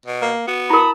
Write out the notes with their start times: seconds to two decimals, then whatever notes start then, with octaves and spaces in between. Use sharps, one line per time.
0.06 B2
0.22 A#3
0.47 B3 F#4
0.70 E4 A#4 A5 B5 D#6